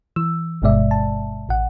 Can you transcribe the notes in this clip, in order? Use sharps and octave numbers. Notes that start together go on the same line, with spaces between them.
E3 E6
G1 G2 B2 G#3 D5 E5
A5
A1 F#5